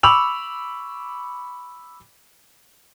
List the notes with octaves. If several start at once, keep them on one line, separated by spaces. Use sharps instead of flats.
B5 C#6 D6 E6 F7 F#7